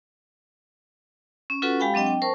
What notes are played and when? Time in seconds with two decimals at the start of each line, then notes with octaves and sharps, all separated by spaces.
1.50 C#4
1.62 C#4 F4 F#4 A4 B4 F#5
1.79 G#3 G4 F5 G5 G#5 B5
1.94 F#3 C4 D4 D#5 G5
2.06 G5
2.22 A#4 C5 A5 C#6